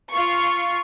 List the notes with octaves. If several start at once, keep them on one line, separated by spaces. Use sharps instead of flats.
F4 C#6